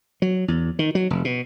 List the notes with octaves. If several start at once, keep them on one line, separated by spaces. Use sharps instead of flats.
F#3
E2
D#3
F#3
F1
B2